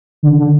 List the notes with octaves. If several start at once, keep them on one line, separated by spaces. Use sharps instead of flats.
D3
D3